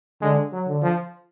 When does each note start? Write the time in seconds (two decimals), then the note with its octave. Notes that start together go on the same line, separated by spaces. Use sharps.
0.22 D3 G#3
0.53 F#3
0.68 D3
0.82 F3